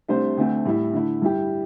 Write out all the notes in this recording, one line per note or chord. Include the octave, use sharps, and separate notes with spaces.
C2 C3 A3 D4 C5
D2 D3 A3 C4
A2 G3 E4
D3 A3 E4
G2 G3 E4 G4